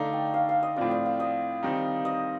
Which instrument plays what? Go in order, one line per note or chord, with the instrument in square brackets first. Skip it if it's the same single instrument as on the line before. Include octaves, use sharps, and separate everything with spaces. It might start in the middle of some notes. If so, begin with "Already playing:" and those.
Already playing: [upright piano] D3 A3 D#4 [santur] D5 F5
[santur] G5
F5
F5
D#5
[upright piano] A2 F3 C4 F4 [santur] D5
[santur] D5
F5
D#5
[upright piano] D#3 G3 C4 D#4 G4
[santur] D#5